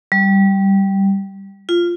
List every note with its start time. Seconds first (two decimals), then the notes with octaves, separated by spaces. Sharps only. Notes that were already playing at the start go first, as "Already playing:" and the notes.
0.12 G3
1.69 F4